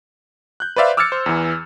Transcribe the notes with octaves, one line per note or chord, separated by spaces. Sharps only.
F#6 G6
B4 C5 D5 E5 F5
D6 E6 F6 G#6 A6 C#7
C5
E2 E3